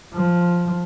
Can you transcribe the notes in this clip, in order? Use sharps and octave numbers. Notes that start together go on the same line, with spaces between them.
F3